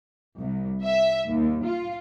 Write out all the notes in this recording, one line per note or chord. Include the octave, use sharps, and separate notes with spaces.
C2
E5
D#2
F4